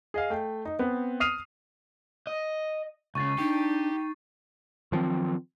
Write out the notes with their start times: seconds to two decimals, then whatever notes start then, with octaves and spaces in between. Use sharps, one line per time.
0.14 G#4 D#5 F5
0.30 A3 G5
0.65 D#4
0.79 B3 C4
1.20 D#6 F6 C7 D#7 F7
2.27 D#5
3.15 C#2 C#3 C#6 A6 C7
3.38 D4 D#4 G4
4.92 D#3 F3 F#3 C4